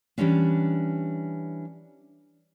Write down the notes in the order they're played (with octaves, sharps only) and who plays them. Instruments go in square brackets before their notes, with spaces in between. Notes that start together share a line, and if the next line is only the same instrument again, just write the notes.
[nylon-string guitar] E3 G3 A#3 C#4 D4